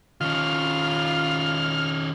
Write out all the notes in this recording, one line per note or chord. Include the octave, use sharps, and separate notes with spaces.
D#3 C#4 F4 F6